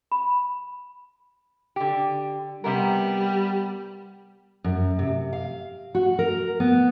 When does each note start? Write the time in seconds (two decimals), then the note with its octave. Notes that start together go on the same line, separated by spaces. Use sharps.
0.12 B5
1.76 D3 G4
2.64 C3 G3 B3 A#4
4.64 F#2
4.99 C3
5.33 F5
5.95 F#4
6.19 A#4
6.60 B3